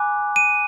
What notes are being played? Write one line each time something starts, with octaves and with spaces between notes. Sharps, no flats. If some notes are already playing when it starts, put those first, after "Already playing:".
Already playing: G#5 B5 D6 F#6
D#7